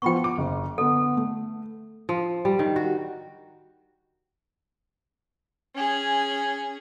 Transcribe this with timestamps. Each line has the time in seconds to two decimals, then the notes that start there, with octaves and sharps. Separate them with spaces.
0.02 F3 B3 G5 B5 C#6
0.24 D6
0.38 F#1
0.78 D3 B3 A4
1.17 A3
2.09 F3
2.45 G3
2.59 D#3
2.76 F#4
5.75 C#4 G#4